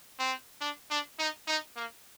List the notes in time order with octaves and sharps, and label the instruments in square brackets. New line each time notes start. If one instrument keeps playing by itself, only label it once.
[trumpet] C4
D4
D4
D#4
D#4
A#3